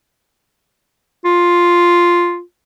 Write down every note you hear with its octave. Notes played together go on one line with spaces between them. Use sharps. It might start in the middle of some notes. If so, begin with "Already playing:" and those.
F4